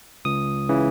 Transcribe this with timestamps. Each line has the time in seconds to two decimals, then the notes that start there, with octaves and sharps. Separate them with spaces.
0.25 C#2 D#6
0.69 C#3 E3